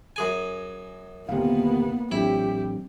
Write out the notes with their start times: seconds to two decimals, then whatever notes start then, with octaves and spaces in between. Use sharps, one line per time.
0.16 F#2 G#4 G#5
1.29 D#1 D2 C3 A#3 B3 F5
2.12 A1 F#3 C4 D4 E4 G4